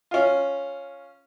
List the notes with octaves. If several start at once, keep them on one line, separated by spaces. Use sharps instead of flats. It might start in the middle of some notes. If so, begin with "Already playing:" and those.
C#4 F4